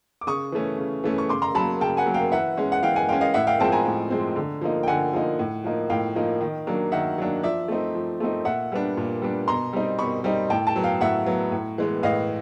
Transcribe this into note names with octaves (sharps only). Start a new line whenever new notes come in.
D6
C#3 C#6 D#6
E3 A3 C#4
C#3
E3 A3 C#4
C#6
C#3 C6 D6
A#5 C6
F#3 A#3 A5 B5
C#3 G5 A5
F#5 G#5
F#3 A#3
F5 G5
E3 E5 F#5
G#3 C#4
F#5
E3 F5 G5
F#5 G#5
G#3 C#4 F5 G5
D#5 F5
A2 E5 F#5
F5 G5
F3 G#3 C4 G5 A5
G#5 A#5
A2
F3 G#3 C4
D3
F3 A#3 D#4
G5
D3 F#5 G#5
F3 A#3 D#4
A2
F3 A#3 D#4
A2 F5 G5
F3 A#3 D#4
D#3
F#3 A#3 D4
D#3 E5 F#5
F#3 A#3 D4
F3 D5 E5
A3 C4 D#4
F3
A3 C4 D#4
A#2 E5 F#5
G3 B3 D4
A#2
G3 B3 D4
B2 A#5 C6
G3 C4 D#4
B2 B5 C#6
G3 C4 D#4
A2 G5 A5
G5 A5
F#3 B3
F5 G5
A2 E5 F#5
F#3 B3
A2
E3 G#3 B3
A2 D#5 F5